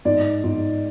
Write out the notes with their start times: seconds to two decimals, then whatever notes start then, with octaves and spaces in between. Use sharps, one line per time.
0.05 G#2 D5
0.44 G#2